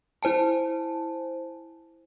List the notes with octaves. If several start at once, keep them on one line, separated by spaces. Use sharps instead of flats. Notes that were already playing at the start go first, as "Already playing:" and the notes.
E4 C5 G#5 A5